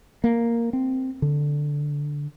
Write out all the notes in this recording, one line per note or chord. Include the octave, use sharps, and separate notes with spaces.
A#3
C4
D3